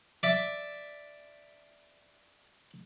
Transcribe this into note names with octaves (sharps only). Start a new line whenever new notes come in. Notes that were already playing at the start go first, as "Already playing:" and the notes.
D5 E5